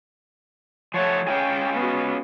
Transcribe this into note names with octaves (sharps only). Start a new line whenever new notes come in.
F3 A3 C#5 F#5
C#4 F4 G#4 G5
B3 F#4